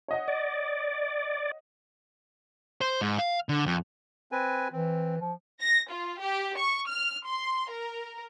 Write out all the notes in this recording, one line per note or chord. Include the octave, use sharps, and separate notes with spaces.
C#5 D#5 F#5
D5
C5
G#2
F5
D3
F2
C4 B4 G#5
E3 C4
F3
A#6
F4
G4
C#6
F6
C6
A#4